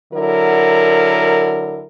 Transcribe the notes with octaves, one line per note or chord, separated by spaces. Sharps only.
D3 F#3 E4 A#4